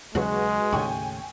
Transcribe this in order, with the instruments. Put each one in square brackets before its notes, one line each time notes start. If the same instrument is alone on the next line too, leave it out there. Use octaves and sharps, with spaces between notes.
[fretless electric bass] D#2 C#3 F#3 [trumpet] G#3 [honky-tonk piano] F#4 G#4 B4
[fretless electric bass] D#2 A2 C#3 [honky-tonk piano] G5 G#5 C#6